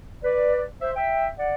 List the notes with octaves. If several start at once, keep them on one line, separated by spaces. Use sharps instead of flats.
B4 D5
C5 E5
E5 G5
D5 F#5